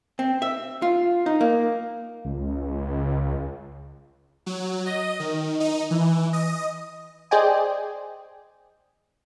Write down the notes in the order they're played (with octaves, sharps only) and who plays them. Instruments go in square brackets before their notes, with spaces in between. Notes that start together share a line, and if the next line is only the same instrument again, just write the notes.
[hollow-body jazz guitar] C4
E5
F4
D#4
A#3
[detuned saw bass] C#2
[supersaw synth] F#3
D#5
D#3
D#4
E3
D#5
[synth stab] G#4 C5 D5 D#5 G5 G#5